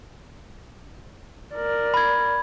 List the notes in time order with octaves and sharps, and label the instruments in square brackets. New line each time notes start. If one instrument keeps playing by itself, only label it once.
[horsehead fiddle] A#4 D5
[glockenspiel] B5 G#6